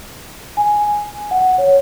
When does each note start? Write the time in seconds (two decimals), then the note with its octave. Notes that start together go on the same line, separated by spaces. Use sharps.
0.57 G#5
1.31 F#5
1.58 C#5